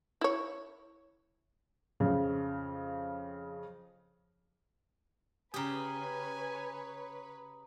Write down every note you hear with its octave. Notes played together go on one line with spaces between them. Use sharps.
E4 C#5
F2 C#3
C#3 G4 B4 C#5 G#5 A#5 B5 D#6